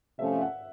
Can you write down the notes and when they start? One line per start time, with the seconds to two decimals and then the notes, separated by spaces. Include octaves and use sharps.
0.18 C3 F3 A3 C#4 F4 E5
0.41 F#5